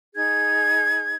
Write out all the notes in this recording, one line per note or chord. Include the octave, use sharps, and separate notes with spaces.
D#4 G#4 G#6